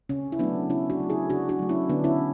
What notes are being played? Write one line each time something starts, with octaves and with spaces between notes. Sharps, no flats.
C#3 C#4
E4
F#3 A3 B3 D4
C#3 C#4 E4
D4 F#4
F#3 A3
E4 G#4
C#3 D4 F#4
D4 F#4
F#3 A3
C#4 E4
D3 B3 D4
C#4 E4